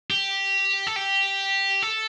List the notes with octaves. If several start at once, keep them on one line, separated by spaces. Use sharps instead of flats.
G4
A4
G4
A4